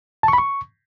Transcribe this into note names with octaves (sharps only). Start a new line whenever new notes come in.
A5
C#6
B5
C#6